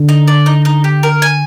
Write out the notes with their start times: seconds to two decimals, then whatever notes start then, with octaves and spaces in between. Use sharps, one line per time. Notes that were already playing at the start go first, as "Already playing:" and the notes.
Already playing: D3
0.09 D#4
0.28 D5
0.46 D#4
0.65 D#4
0.84 G4
1.03 A#4
1.22 G#5